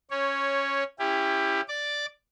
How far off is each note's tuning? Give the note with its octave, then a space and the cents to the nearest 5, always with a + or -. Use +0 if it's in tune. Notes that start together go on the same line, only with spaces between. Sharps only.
C#4 -10 C#5 +0
C#4 +0 E4 +10 G4 +20
D5 +0 D6 +0